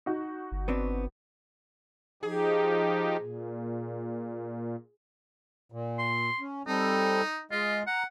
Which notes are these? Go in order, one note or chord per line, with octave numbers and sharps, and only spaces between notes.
D#4 F#4
G1
B3 C4 D4
F3 D#4 G4 G#4
A#2
A#2
C6
C#4
G3 C4 D#4 A4
G#3 F4 D#5
F#5 A#5